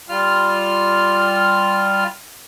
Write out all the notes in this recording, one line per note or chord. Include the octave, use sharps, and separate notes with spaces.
G3 F4 F6